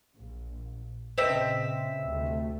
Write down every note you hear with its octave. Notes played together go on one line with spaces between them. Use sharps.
A#1
A#2 C#3 C4 B4 C5 D#5 E5
D2 C3 A3